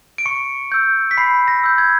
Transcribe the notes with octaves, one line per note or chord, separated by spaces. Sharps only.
D7
C#6 C#7
E6 G6
B6
B5 C7
A#6
E6 G6
G#6